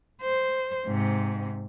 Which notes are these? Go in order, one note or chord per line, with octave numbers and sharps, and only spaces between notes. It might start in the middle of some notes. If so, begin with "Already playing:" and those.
C5
G#2 C3